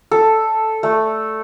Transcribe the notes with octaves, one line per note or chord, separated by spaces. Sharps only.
A4
A3